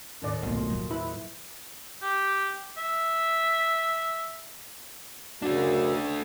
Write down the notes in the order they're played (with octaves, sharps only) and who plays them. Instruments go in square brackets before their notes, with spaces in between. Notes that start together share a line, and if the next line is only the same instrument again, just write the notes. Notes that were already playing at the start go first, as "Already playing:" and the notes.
[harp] D#2 A2 [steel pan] C#4 D5
[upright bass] B1 A2 [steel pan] A#3 [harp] F4
[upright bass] F#3
[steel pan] E4 E5 B5 [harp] B4
[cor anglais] G4
E5
[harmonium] F#2 C#3 F#4 [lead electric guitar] A3 D4